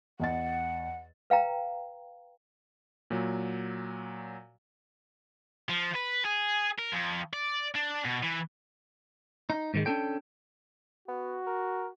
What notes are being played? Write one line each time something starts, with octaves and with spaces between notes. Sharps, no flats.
E2 D#5 F#5 A6
B4 F5 G5 A#5
A#2 F#3
F3
B4
G#4
A#4
F2
D5
D4
B2
E3
D#4
G#2 D#3 G#3
C#4 D4 A4 G5
B3 F#4
A#4